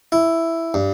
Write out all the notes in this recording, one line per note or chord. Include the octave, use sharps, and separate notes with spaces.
E4
G2